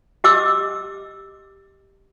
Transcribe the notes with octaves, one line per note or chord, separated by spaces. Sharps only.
G4 D#5 D6 E6